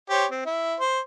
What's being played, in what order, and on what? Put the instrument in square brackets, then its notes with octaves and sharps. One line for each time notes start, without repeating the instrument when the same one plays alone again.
[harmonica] G4 C5 C#5
C4
E4
C5